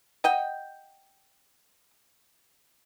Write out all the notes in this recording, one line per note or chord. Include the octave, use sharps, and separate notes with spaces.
D#5 F#5 G5